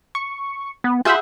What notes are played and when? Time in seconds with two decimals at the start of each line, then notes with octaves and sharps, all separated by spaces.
0.15 C#6
0.84 B3
1.05 F4 G#4 E5 F#5 B5 E6 G6